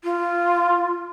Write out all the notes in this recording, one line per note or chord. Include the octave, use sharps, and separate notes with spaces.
F4